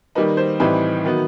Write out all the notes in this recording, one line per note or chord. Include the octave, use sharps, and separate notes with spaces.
D#3 G3 A#3 D#4 B4
C5
A2 E3 G3 C4 D#4 B4
D#3 F#3 B3